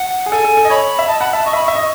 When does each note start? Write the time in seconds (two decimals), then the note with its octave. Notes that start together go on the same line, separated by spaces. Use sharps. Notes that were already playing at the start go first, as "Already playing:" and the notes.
Already playing: F#5
0.26 G#4
0.32 A4 G#5
0.45 A4
0.57 A4
0.65 D#5
0.70 C#5 B5
0.99 E5
1.08 D#5 A5
1.20 F#5 B5
1.33 E5 A5
1.46 D#5 C#6
1.53 E5 B5
1.60 D#5
1.65 E5 C#6
1.75 D#5